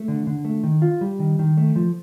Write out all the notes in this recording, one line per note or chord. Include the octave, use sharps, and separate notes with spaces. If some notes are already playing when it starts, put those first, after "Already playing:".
Already playing: A3
D3
D3
A3
D#3
F4
G3
D#3
D#3
A3
F3